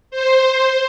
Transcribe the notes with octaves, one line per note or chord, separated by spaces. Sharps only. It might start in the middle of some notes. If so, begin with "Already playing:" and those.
C5